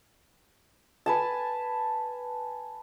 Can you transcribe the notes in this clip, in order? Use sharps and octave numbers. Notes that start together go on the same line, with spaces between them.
B4 G#5 A5